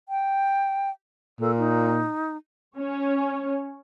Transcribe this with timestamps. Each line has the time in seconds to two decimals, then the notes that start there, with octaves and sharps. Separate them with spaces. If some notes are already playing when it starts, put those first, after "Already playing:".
0.09 G5
1.40 A#2 A4
1.58 D#4
2.77 C#4 C#5